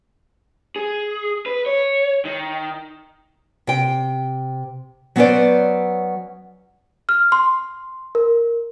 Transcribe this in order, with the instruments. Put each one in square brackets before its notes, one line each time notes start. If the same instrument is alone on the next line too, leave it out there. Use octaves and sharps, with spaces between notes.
[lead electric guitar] G#4
B4
C#5
D#3
[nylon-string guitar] C3 G5
F#3 B3 C#4 B4 C5 D5
[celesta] F6
C6
A#4